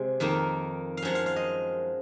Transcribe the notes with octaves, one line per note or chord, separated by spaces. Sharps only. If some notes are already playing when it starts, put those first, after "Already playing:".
Already playing: C3 G#3
F2 D#3 A#3
F5
F#2 F3 G#3 F#5
F5
F5
D#5